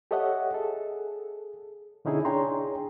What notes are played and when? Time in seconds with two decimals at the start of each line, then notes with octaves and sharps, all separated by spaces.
0.11 G4 A4 C#5 D#5 E5 F#5
0.53 G#4 A4
2.05 B2 D3 C#4 D#4 E4 G#4
2.25 D4 G#4 C#5 G5 A#5 C6